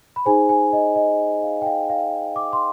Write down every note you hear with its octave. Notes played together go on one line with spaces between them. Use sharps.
B5
D#4 G#4 C5 G#5
G#5
D#5
D#5
F5
G5
F5
F5
D6
C6